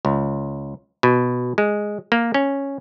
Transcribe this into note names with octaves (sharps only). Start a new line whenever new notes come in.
C#2
B2
G#3
A#3
C#4